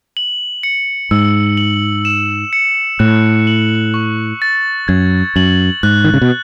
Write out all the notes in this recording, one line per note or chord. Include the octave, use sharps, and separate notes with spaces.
F#7
C#7
G#2 E6
F#7
E7
C#7
A2 F#6
F#7
C#6
A6
F#2 G#6
F#2 F#7
G#2 F#6
D#3
C#3
B2